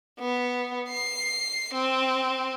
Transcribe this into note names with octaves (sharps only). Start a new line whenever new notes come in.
B3
C7
C4